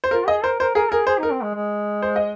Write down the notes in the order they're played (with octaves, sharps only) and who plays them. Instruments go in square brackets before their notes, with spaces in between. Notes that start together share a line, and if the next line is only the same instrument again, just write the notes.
[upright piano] C5
[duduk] F4 [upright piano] A#4
[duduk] G#4 [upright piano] D#5
[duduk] A#4 [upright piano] C5
[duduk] A#4 [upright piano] C5
[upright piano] G#4 [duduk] A#4
[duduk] G#4 [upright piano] A#4
[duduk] G#4 [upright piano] C5
[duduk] D#4 [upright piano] A#4
[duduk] C4
G#3
G#3
[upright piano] C5
D#5